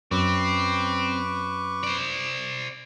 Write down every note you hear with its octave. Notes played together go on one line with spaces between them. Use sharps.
F#2 C4 B4 C#6 D6
C5 D5